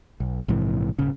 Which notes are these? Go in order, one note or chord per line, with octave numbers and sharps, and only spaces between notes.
B1
A#1 G#2 C3 E3
D#1 G#1 C#3